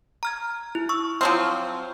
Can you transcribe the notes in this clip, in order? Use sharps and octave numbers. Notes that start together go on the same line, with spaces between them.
A#5 F6 G#6
E4
C#6 E6
F3 F#3 C4 F6